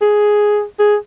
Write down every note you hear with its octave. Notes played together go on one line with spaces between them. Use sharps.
G#4
G#4